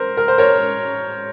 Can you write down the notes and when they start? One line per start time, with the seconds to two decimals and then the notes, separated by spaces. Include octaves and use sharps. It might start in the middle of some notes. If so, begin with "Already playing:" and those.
Already playing: A#4 C5
0.17 A#4
0.28 C5
0.38 A#4 C#5